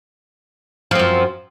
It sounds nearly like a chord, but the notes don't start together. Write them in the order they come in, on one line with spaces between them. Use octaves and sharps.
F3 C4 F#2